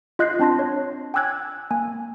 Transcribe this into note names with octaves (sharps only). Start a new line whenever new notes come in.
F4 D#5 F#6 G6 A#6 C7
C4 D4 A5 C6 A#6
C#5
G5 G#5 D6 E6 F#6 G#6
A#3 G#5